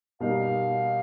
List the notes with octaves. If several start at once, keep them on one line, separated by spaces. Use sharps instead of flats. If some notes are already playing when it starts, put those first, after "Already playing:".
B2 G3 A#3 D#4 F5